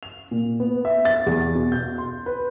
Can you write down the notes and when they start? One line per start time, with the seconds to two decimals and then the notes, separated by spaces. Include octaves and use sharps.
0.03 F7
0.31 A#2
0.60 B3
0.85 E5
1.05 A6
1.26 E2
1.55 B2
1.72 G6
1.98 C6
2.26 B4